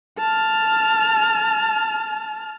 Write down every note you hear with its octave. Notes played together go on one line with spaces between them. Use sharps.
A5 F6